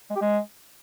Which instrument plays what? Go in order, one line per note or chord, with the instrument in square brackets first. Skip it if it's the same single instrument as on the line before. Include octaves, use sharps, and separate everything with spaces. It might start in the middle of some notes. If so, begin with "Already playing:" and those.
[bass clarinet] G#3
G4
G#3